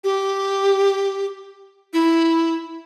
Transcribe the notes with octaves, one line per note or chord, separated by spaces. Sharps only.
G4
E4